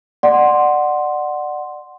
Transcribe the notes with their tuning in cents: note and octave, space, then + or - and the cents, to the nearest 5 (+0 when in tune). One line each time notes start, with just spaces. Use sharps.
D5 +20 F#5 +0 C6 +0